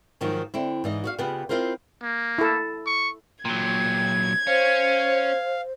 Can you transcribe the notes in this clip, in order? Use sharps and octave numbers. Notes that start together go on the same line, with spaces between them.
G#2 D#3 F3 F#3
D3 C4 E4
G#2 E3 D#5
F#4 D5 F5
C#3 B3 F4 G4 B4 F#5
C4 E4 F4 A#4 C5
A#3
E4 A4
C#6
A#2 F#3 G5 G#6
C#4 C5 F5